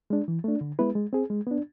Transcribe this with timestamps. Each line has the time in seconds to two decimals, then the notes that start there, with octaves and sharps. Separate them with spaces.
0.10 G#3 D4
0.28 E3
0.44 A3 D4
0.61 D3
0.79 G#3 B3 E4 B4
0.95 G#3
1.13 C4 G#4
1.30 G#3
1.47 B3 D4